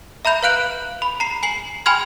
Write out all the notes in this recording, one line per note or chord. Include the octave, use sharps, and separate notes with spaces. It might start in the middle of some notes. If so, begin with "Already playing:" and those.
E5 A#5 B5 G6 F7
B4 F5 F#6 D7 F#7
B5
A#5 C7
G#5 C7 F#7
G5 G#5 B5 C6 F6 G#6